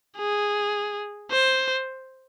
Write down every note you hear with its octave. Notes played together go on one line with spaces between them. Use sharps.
G#4
C5